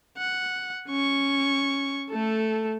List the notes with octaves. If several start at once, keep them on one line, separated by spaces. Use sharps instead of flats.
F#5
C#4 C#6
A3 A4